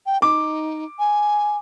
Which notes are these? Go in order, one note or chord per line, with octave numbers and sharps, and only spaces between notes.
G5
D#4 D6
G#5